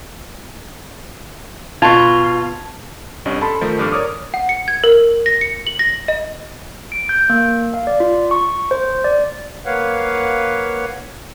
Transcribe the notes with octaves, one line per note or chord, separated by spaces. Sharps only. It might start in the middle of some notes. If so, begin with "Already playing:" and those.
B2 F4 A5 G#6
C2 G2 C#4 D#5
A4 A5 B5 C6
D#3 F3 A3 D#4
G#1 G2 A4 D6 F6
A#4 C#5 D5 D6 D#6 F6
F#5
C#7
G#6
A#4
A#6
C#7
F#7
A#6
D#5
D7
G6
A#3
F5
D5
F4
C#6
C5
D5
A#3 B4 C#5 F5 F#5